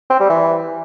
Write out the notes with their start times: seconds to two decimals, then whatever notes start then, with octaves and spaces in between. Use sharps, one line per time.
0.10 C4
0.20 G3
0.30 E3